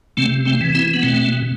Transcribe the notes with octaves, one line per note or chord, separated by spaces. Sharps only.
C3 A3 C4
A3 C4
E3
C4 E4
B3
B2 A3 C4